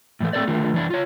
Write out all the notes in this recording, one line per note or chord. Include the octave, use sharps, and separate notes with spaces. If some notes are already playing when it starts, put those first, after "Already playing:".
A2 E3 A3
A3 C4 A4 C5 D5
D3 D#3 A3 F4
E3 D4 E4
F4 C#5